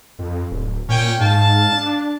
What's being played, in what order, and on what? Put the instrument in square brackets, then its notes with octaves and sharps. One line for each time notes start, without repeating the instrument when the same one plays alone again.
[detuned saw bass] F2
D1
[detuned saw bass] A#2 [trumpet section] C#4 G5
[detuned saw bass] G#2 [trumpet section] F5 A5
[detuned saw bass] D4